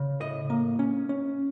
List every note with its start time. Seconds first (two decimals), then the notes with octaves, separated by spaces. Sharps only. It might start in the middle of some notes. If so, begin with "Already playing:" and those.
Already playing: C#3
0.20 A2 D#5
0.50 A#3
0.79 C#4
1.09 C#4